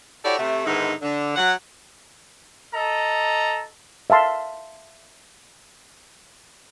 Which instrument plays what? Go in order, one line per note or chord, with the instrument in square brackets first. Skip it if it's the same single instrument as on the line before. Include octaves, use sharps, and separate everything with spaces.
[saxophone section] E4 F#4 G4 A4 C#5 D5
C3 A3
G#2 D3 D#3 B3 D#4 E4
D3
F#3 F#5
[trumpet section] A4 D#5 A#5
[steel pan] E5 F5 A5 C6